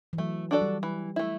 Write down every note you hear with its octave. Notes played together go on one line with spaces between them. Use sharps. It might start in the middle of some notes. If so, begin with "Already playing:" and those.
E3
F#3 A3
D4 F#4 A4 D5
G3
E3
A3 E4